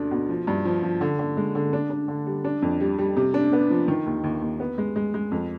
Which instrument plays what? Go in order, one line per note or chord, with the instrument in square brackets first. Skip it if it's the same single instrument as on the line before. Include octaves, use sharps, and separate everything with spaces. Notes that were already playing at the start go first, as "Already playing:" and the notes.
Already playing: [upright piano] D2 B2 D4
B2
F3
G2
F3
F3
D3
D3
G#3
D3
D4
D4
D3
G3
D4
F2
G3
G3
C3
D4
B3
F3
D#3
D#2
D#2
D#2
B3
G#3
G#3
G#3
F2